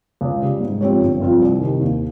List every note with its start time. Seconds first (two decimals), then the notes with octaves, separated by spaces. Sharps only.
0.21 C#2
0.42 C#3 G3
0.61 G#2
0.81 F3 C4 G4 C#5
1.01 G1
1.20 G2 F3 C4 F4
1.41 C2
1.61 C3 D#3
1.81 D#2